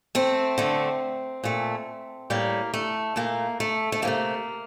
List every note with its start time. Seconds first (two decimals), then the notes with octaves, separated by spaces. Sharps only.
0.15 A3 C4
0.58 D3 A3
1.44 A#2 A3
2.30 A2 G3 A#3
2.74 A3
3.16 A#2 A3 A#3
3.60 A3
3.92 A3
4.02 C3 F#3 A#3
4.07 A3